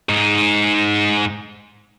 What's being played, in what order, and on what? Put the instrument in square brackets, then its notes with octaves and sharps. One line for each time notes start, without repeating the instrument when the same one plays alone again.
[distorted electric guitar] G#2 D#4